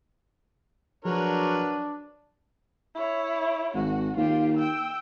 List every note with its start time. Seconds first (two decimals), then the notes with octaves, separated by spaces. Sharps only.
1.05 F3 F#3 D4 F#4 G#4 A#4 B4 C#5
2.95 E4 C#5
3.74 G#1 F#4
4.17 D#2 F4 G4
4.57 G5 E6